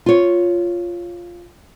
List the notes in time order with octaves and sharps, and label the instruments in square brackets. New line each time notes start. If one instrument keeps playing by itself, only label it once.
[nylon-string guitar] F4 C#5